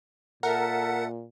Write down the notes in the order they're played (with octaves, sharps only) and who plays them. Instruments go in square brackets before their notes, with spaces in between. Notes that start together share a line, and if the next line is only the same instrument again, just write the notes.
[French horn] A#2 [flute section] A4 E5 [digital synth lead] A#4 [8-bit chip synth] F#5